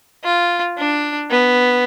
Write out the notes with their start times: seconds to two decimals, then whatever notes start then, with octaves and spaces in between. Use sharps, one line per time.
0.24 F4
0.77 D4
1.30 B3